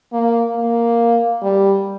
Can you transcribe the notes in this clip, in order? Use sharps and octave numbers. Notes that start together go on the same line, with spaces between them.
A#3
A#3
G3